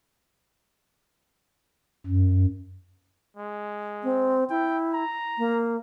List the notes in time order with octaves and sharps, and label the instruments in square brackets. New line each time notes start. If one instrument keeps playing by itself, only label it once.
[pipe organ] F#2
[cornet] G#3
[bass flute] C4
[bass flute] E4 [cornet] G5
[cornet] A#5
[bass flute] A#3